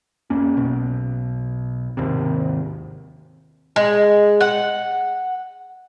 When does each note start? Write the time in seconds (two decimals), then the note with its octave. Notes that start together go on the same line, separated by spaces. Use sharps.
0.30 F2 A#3 C#4
0.57 B1 B2
1.97 G#1 D#2 C3
3.76 G#3
4.41 F#5